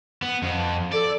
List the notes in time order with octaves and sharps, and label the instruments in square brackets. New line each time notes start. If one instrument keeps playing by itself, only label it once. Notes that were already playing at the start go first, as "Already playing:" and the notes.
[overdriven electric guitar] B3
F2
[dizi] A4 [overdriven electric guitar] D5